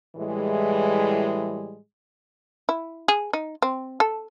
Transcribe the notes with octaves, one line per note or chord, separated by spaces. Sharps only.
A2 E3 G3 G#3
E4
G#4
D#4
C4
A4